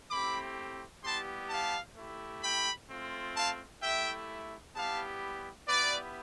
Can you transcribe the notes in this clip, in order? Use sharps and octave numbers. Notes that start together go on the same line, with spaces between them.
A3 C4 E4 G4 B5 D6
G3 B3 E4 G4 A5 C6
F5 A5
A3 E4 G4
G5 B5
A3 C4 F4
F5 A5
A3 E4 G4 E5 G5
G3 B3 E4 G4 F5 A5
B3 E4 G4 B4 D5